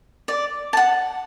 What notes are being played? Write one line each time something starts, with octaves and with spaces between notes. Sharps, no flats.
D5
F#5 A5